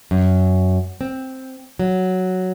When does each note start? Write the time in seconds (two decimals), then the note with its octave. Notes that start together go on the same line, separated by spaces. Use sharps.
0.11 F#2
1.01 C4
1.79 F#3